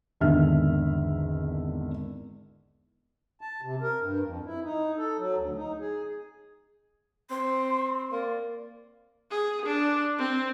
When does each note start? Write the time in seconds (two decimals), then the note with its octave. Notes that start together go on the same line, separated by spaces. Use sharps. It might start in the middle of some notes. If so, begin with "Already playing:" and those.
0.21 G#1 E2 D3 D#3 E5 F6
3.41 A5
3.62 C3
3.81 A#4
4.00 G2
4.23 F2
4.44 E4
4.63 D#4
4.97 A4
5.18 F#3
5.37 D2
5.55 D#4
5.80 G#4
7.30 C4 C6
8.11 A#3 D5
9.30 G#4
9.66 D4
10.18 C4